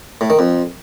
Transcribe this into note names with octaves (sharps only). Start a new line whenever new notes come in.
A2
D#3
F2